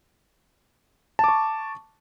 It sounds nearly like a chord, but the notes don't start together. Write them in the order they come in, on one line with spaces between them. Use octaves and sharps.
A5 D6 C#6